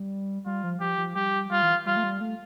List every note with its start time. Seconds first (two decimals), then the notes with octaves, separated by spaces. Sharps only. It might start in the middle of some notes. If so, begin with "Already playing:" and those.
Already playing: G3
0.45 G3 F4
0.64 F3
0.80 F3 G4
0.98 F3
1.15 G3 G4
1.50 G3 F4
1.62 E3
1.86 G3 F4
1.97 A3
2.04 G3
2.21 A3